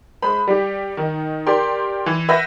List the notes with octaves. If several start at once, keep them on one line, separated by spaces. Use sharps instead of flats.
G#3 C5 B5
G3 G4
D#3 D#4
G4 A#4 D5 G5 C6
E3
B4 E5 F#5 G6 A#6